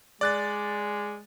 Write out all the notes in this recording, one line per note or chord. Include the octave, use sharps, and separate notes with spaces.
G#3 D5 F#6 A6